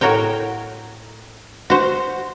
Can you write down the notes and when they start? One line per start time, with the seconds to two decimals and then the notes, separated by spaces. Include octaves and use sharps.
0.01 A2 F#4 A#4 C#5 G5
1.70 F#4 C5